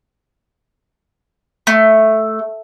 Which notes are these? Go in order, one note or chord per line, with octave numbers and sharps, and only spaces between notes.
A3